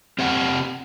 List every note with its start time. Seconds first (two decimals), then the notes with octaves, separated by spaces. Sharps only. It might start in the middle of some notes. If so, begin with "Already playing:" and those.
0.19 C4 G4 D#5 F#5